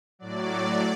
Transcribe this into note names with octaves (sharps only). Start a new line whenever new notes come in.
A2 F#3 D5